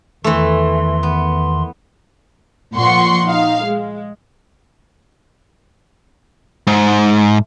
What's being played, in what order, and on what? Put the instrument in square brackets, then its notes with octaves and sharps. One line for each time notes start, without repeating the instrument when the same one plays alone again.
[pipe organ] E2 D#3 C6 [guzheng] E3 A3
[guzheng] B3
[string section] A#2 F3 F#5 C6 C#6
D#4 F5
G#3
[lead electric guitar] G#2